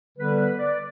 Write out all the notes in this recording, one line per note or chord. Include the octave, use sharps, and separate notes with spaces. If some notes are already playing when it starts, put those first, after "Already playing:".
D3 G3 B3 B4
B4
D5